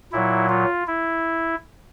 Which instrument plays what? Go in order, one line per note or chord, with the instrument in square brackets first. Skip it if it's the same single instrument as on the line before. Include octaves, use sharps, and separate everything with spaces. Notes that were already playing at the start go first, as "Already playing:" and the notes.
[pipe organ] A#2 F#3 E4
F4
E4